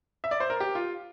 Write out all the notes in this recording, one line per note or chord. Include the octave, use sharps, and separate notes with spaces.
E5
D5
C5
A#4
G4
F4